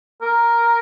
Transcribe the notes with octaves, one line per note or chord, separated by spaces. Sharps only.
A#4